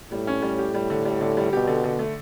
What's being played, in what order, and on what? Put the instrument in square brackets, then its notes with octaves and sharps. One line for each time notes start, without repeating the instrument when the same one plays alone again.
[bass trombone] A2 [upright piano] G3
[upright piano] C#4
G3
G4
G3
D3
G3
D3
G3
[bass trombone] B2 [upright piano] G4
[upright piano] D3
D3
A3